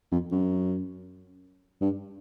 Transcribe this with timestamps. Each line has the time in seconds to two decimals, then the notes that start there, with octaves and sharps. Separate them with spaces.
0.12 F2
0.31 F#2
1.81 G2